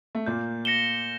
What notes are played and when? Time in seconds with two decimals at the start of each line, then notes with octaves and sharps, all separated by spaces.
0.15 A3
0.26 A#2 A#3 G6
0.65 A#6 C#7 E7 G7